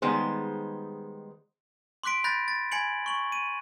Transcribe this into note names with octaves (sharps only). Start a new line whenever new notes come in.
D#3 G3 G#3 B3 G#4 C5
C6 D6 F#6 B6 D7
B5 F#6 G6 A6 A#6
A6
G#5 B5 G#6 C#7 D7 F#7
C#6 F#7
D#7